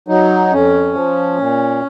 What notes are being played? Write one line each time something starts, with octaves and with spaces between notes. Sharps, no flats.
F#3 D#4
F2 C#4
F3
A#2